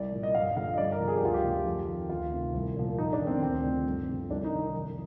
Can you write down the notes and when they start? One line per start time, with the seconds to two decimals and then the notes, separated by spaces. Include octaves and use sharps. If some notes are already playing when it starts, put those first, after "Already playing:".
Already playing: C2 D5
0.12 A#2 F3
0.23 D#5
0.35 G2 F5
0.56 D3 F3 F5
0.74 D#5
0.78 G2 D5
0.92 A#4
1.00 D3 F3
1.08 G#4
1.16 G4
1.22 D2 F4
1.34 G4
1.44 D3 F3
1.66 F2
1.88 D#3
2.09 D2 F4
2.32 C3 D#3
2.54 C2
2.77 A#2 F3
2.98 F2 D#4
3.13 D4
3.20 D#3
3.27 C4
3.43 D2 C4
3.63 D3 F3
3.86 G2
4.09 D3 F3
4.30 C2 D4
4.45 D#4
4.52 C3 D#3
4.75 F2